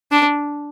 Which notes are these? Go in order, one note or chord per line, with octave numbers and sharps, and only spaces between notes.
D4